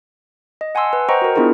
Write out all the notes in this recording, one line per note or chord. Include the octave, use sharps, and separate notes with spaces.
D#5
F#5 G#5 A5 C6 E6
B4
C5 D#5 F#5 G5 A#5 C#6
F#4 A#4
B3 D4 E4 F4 G#4 A#4